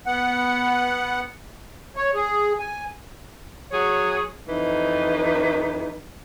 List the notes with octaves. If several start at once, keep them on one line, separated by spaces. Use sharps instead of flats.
B3 F#5
C#5
G#4
G#5
F#3 G#4 C#5
F2 E3 D#4